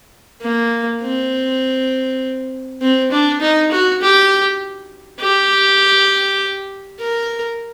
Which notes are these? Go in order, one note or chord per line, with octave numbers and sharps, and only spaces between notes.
A#3
C4
C4
D4
D#4
F#4
G4
G4
A#4